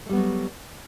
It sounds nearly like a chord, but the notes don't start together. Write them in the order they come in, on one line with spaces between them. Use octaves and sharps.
A3 G3 B3 F#3